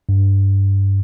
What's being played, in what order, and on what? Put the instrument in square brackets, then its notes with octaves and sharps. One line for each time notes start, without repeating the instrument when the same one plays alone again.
[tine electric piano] G2